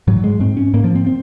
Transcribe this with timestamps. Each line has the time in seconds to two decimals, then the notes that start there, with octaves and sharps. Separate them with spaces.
0.07 G#2 F#3
0.24 G#3
0.40 G#2 C4
0.57 C#4
0.73 G#2 A#3
0.84 F3
0.96 C4
1.06 C4